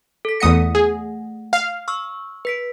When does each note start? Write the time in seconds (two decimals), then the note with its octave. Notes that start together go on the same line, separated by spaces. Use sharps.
0.25 A4 B6
0.40 E2 A3 F#5 D#6 A#6 C#7
0.75 G#4
1.53 F5
1.88 C#6 E6 F6
2.45 B4 B6 D7